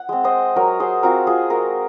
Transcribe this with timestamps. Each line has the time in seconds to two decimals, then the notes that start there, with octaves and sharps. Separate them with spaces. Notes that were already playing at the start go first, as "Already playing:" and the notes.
Already playing: F#5
0.09 G#3 C4
0.24 C5 D#5
0.56 F#3 A#4 C#5
0.80 G#4 C5
1.03 C4 F4 F#4 A#4
1.27 F4 G#4
1.50 G#3 F#4 A#4